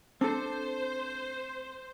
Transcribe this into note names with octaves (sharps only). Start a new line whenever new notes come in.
C4 D4 A4 C5